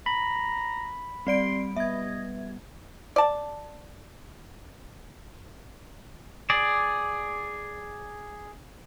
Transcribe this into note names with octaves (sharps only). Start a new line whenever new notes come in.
A#5 B5
G3 C4 D5 C6 D7
B3 D#5 E5 G#6
D5 A5
G#4 D5